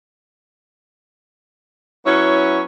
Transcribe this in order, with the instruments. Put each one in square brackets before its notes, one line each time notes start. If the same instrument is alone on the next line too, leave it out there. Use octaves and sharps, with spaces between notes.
[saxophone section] F#3 B3 C#4 E4 C#5